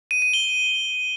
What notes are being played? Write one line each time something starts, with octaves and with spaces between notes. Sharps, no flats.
D#7
D#7
G7